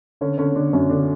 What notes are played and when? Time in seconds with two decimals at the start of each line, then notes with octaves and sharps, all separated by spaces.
0.21 D3 C#4
0.38 D3 C#4
0.56 D3 D4
0.73 F#2 C#4
0.90 D3 D4